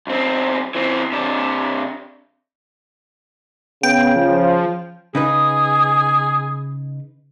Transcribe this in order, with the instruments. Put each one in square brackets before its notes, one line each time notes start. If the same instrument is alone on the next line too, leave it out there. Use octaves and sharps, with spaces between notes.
[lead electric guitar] B1 C4
E3 C4
C3 D4
[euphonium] C#3 [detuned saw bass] B3 [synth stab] G5
[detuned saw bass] F3
[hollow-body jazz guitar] C#3 D#4 B4 [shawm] G#4